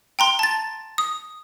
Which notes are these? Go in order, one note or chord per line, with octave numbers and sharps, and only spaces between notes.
G5 A#5 C6
A5 A6
D#6